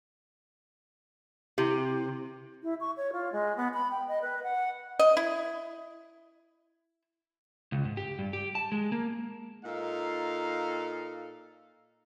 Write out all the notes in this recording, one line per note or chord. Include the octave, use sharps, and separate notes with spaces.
C3 E4 G4
E4
C#6
C#5
F4
G#3
B3
B5
G5
D#5
B4
F#5
D#5
E4
C#2
G#2
G4
G2
G4
A5
G#3
A#3
A#2 D#4 A4 F5